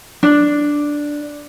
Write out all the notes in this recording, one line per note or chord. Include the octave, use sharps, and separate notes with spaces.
D4